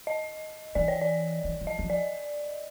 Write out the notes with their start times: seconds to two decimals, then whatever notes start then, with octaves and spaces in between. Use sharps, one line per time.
0.07 D#5
0.75 E3 D5
0.88 C#5
1.02 D5
1.44 E3
1.61 F3
1.67 D#5
1.79 F3
1.90 D5